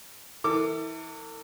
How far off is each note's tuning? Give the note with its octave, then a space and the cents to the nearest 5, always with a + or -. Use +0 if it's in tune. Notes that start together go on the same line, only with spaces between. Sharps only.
E3 -25 A4 +45 D6 +0